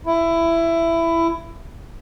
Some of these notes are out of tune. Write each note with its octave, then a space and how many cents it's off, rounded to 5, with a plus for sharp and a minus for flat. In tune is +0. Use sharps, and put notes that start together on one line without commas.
E4 +15